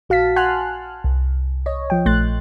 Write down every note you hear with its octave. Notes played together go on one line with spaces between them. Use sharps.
A#1 F#4 F5 A5 B6
F#5 G#5 A5 C6 F6 F#6
C2
C#5 D#5
F3 G5
A#1 A3 C6 F#6 A6